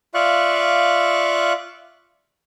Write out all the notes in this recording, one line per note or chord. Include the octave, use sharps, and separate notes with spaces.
F4 D5 E5 F5 C#6 F#6